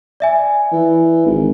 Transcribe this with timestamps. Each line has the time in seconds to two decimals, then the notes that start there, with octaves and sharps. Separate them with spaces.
0.20 D5 E5 G#5
0.72 E3
1.26 G#1